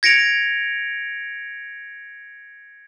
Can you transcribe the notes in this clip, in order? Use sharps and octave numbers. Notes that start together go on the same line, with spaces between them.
G#6 A#6 C#7 D7 F7